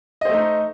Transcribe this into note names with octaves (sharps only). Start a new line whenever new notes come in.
A3 D#4 C5 D#5